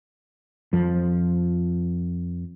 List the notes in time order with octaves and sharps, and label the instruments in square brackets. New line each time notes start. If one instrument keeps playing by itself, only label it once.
[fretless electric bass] F2 F3